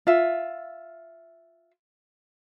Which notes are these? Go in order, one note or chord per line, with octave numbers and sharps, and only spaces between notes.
F4 E5